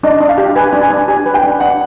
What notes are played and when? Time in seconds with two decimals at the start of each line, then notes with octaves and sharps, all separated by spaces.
0.03 D4 D#5
0.21 D4
0.29 F5
0.38 G4
0.56 B4 G#5
0.73 D4
0.82 G#5
0.90 D4
1.08 G4 G#5
1.26 B4
1.34 G5
1.43 D4
1.60 D4 F#5